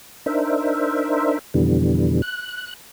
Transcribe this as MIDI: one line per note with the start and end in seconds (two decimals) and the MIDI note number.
0.26 1.39 62
0.26 1.39 63
0.26 1.39 70
0.26 1.39 72
0.26 1.39 76
1.54 2.22 41
1.54 2.22 47
1.54 2.22 50
1.54 2.22 52
1.54 2.22 55
2.22 2.73 90